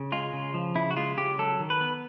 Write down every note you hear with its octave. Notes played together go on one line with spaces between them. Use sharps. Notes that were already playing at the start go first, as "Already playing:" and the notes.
Already playing: C#3
G#3 F4
C#3
F3
C#3 E4
F#4
G#3 F4
C#3 G4
F#3 A4
D#3
B4
B3